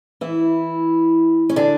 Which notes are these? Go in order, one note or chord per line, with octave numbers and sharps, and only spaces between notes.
E3 E4
C#4
D3 D4